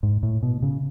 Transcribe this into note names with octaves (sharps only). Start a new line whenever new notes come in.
G#2
A2
B2
C#3